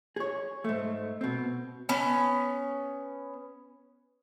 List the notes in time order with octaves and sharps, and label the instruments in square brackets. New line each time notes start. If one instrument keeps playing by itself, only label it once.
[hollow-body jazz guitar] G#4 C#5
G#2 A3
B2 C4
[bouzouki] B3 C#4